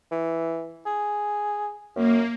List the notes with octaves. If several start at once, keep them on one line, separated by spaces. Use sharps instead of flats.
E3
G#4
F#2 A#3